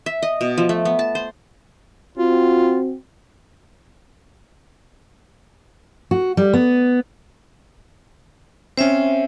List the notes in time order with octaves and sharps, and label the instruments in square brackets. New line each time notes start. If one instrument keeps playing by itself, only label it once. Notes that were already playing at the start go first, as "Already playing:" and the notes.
[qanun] E5
D#5
B2
F3
A3
B3
A5
C5
[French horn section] C4 F#4 [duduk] F4
[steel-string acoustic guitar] F#4
G3
B3
[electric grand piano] C4 C#4 [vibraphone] C5 E5